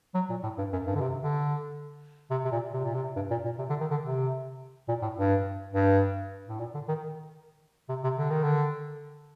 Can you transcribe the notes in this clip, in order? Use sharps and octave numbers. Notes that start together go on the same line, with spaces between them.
F#3
A#2
A2
G2
F#2
G2
D3
C3
D3
C3
C3
A#2
C3
A#2
C3
G2
A#2
A#2
C3
D3
D#3
D3
C3
A#2
A2
G2
G2
A2
A#2
D3
D#3
C3
C3
D3
D#3
D3